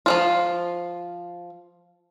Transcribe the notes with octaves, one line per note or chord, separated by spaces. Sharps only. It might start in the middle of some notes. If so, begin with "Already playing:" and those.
F3 F#3 F4